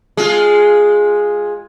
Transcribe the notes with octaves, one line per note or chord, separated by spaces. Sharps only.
G#3 F4